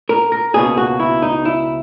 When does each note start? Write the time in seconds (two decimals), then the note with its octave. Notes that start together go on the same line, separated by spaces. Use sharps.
0.09 A#4
0.32 A#4
0.54 C#2 B2 A#3 C#4 G#4
0.77 F#4
1.00 E4
1.22 D#4
1.45 E4